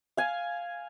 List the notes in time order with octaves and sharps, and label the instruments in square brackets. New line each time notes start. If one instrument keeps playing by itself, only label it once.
[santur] F5 G#5